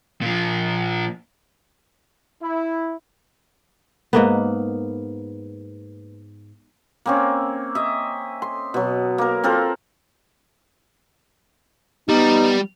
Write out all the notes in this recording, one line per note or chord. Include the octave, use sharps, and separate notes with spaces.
A#2 F3
E4
G#2 A#3 B3
A#3 C4 C#4
D#5 E5
C6
B2 F#3
A#3 A#4
C4 F4 A4 A#4
G3 B3 D#4